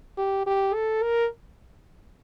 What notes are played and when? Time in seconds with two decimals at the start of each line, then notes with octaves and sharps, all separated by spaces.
0.17 G4
0.46 G4
0.74 A4
1.02 A#4